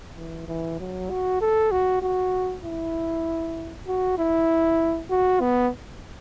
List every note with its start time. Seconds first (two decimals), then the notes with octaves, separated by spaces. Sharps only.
0.17 E3
0.48 E3
0.80 F#3
1.10 F#4
1.41 A4
1.71 F#4
2.02 F#4
2.64 E4
3.87 F#4
4.18 E4
5.10 F#4
5.41 B3